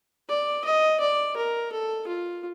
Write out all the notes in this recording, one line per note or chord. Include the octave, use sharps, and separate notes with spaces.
D5
D#5
D5
A#4
A4
F4